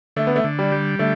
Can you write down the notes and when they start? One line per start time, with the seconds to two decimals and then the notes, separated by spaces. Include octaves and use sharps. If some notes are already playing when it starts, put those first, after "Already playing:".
0.16 D3 A3
0.27 B3
0.36 A3
0.44 D3
0.59 G3
0.72 G3
0.99 D3 A3